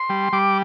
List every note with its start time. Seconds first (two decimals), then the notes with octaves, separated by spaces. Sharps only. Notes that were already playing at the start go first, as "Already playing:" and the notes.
Already playing: C6
0.09 G3
0.33 G3 D6